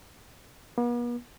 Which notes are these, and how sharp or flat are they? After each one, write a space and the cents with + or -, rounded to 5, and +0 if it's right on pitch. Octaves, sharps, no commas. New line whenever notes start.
B3 -45